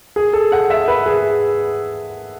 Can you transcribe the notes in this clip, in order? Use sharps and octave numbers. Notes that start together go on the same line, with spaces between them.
G#4
A4
F#5
E5
B4
G#4